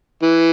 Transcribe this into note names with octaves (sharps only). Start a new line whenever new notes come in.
E3